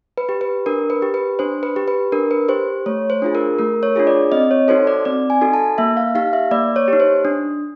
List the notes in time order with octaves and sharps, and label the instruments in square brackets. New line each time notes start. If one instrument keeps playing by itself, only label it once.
[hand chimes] B4
G4
B4
D4 A#4
B4
G4
B4
D4 C5
B4
G4
B4
D4 A#4
B4
G4 C5
A3 C#5
C5
D4 F4 G#4
A#4
A3 A#4
C#5
D4 F4 G#4
D5
C4 D#5
C#5
D#4 F#4 A4 C5
D5
C4 D5
G#5
D#4 F#4 A4
A5
A#3 E5
F5
D#4 G4 F5
E5
A#3 D5
C#5
D#4 G4
C5
D4